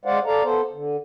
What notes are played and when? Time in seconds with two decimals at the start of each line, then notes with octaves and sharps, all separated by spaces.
0.05 G#3 C5 D5 F5 F#5
0.26 A4 D5 F5 A#5
0.43 B3 A4 C5
0.73 D3